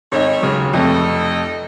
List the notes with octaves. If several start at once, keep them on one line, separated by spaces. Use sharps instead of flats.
G#1 A3 C#4 D#4 C#5
D#2 C#3 F#3
F1 F2 A3 D#4 A4 D#5